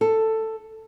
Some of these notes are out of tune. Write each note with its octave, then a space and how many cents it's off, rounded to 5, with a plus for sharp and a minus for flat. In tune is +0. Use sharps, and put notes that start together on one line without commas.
A4 +10